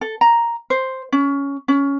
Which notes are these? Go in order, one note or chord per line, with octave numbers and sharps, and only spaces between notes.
A4
A#5
C5
C#4
C#4